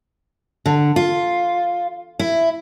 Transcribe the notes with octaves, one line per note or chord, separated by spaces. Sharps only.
D3
F4
E4